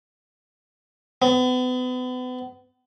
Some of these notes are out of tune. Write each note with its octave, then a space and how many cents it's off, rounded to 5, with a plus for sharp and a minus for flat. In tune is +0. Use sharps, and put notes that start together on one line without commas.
B3 +35